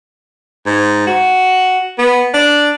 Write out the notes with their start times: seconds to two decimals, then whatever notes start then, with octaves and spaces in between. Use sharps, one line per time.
0.66 G#2
1.07 F#4
1.98 B3
2.34 D4